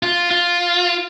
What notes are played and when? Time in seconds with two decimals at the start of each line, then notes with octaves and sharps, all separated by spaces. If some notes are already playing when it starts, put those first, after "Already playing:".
0.03 F4
0.31 F4